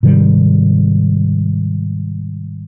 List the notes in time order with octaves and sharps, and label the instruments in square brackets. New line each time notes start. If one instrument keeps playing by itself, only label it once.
[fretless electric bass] G#2 C3 D#3 G3